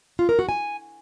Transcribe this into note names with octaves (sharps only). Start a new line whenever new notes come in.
F4
A#4
F#4
G#5